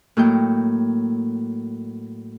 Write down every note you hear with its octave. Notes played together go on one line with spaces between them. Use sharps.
A2 F#3 A#3 D#5 G5 G6